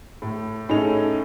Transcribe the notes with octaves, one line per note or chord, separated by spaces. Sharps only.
A2
A2 C#4 D#4 G#4 A4 F7